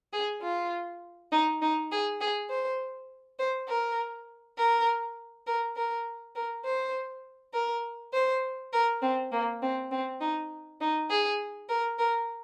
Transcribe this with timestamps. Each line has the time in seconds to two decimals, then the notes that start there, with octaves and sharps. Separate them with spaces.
0.13 G#4
0.42 F4
1.32 D#4
1.62 D#4
1.91 G#4
2.21 G#4
2.50 C5
3.39 C5
3.69 A#4
4.57 A#4
5.47 A#4
5.76 A#4
6.36 A#4
6.65 C5
7.54 A#4
8.14 C5
8.73 A#4
9.02 C4
9.32 A#3
9.62 C4
9.91 C4
10.21 D#4
10.81 D#4
11.10 G#4
11.69 A#4
11.99 A#4